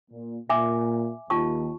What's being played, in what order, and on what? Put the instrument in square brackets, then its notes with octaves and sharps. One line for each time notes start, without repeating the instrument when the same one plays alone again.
[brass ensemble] A#2
[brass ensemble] A#2 [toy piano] E5 G#5 D6
[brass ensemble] D#2 [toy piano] F4 A5 C#6